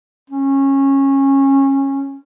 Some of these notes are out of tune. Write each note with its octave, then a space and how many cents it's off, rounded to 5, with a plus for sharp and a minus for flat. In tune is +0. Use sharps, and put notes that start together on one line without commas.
C#4 -20